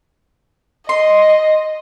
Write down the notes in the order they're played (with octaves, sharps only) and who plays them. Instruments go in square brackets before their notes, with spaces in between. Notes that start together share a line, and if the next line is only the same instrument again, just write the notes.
[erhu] D#5 [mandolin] C6